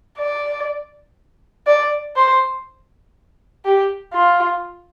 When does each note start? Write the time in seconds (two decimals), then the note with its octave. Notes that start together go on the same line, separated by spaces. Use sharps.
0.18 D5
1.67 D5
2.16 C5
3.65 G4
4.14 F4